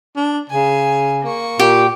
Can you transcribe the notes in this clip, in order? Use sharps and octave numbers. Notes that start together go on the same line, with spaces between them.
D4
C#3 G#5
A#3 C#6
A#2 G4